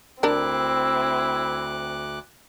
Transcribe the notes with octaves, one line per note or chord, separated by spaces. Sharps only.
D2 C4 D4 E4 A#4 D6 F#6